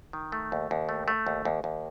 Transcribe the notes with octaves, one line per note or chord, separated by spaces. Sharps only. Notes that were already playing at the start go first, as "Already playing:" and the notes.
D#3
A3
D#2
D#2
A3
A3
D#2
D#2
D#2